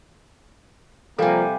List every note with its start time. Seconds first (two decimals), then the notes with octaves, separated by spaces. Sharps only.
1.19 C3 F3 G3 A#3 A4 D5 F5 G#5